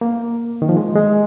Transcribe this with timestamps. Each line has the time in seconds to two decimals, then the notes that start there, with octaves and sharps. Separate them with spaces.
0.01 A#3
0.62 D#3
0.69 F3
0.77 G#3
0.96 G#3